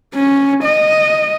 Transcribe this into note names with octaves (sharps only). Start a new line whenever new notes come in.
C#4
D#5